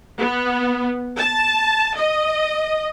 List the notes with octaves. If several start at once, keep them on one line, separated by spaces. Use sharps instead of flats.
B3
A5
D#5